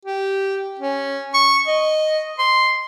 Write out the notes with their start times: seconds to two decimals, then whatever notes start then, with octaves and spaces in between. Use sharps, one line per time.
0.05 G4
0.80 C#4
1.34 C#6
1.67 D#5
2.39 C6